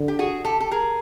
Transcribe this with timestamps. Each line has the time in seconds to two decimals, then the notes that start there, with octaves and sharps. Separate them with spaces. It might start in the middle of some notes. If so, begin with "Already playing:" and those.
Already playing: D3
0.08 G4
0.19 F#4 G#4
0.45 G4 A4
0.60 A4
0.71 G#4 A#4